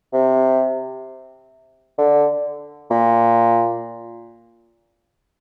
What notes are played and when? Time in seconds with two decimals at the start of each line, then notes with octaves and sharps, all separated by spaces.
0.13 C3
1.98 D3
2.90 A#2